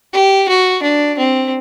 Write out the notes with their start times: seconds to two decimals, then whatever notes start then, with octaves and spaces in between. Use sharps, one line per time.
0.13 G4
0.48 F#4
0.83 D4
1.18 C4